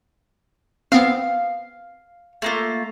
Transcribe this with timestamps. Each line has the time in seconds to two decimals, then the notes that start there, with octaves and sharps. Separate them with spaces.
0.92 B3 C4 F5
2.42 A3 A#3 F4